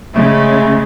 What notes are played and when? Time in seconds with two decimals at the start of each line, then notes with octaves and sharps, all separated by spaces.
0.14 C#3 G#3 A3